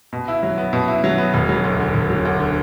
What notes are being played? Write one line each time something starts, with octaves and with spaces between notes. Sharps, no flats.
B2
E4
F#3
B3
B2
E4
F#3
B3
E1
F#3
D2
D3
E1
F#3
D2
D3